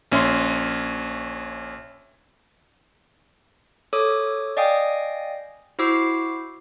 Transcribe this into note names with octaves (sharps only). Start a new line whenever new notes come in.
A#1 C#4 E5 C6
A4 C#5 D6 D#6
D5 D#5 F5 G5 G#5 D#6
E4 F#4 C5 D6 E6 C7